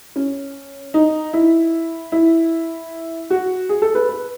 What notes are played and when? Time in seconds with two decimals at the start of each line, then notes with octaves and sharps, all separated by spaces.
0.16 C#4
0.94 D#4
1.33 E4
2.12 E4
3.30 F#4
3.69 G#4
3.82 A4
3.95 B4
4.09 B4